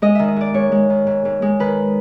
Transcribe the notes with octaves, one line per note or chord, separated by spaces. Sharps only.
G#3 D#5
D#3 E5
D#5
G#2 D5
G#2 C#5
G#3
D#3
G#2
G#2
G#3
D#3 B4